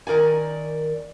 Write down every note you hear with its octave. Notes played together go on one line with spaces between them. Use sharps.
D#3 A#4 D5 G#5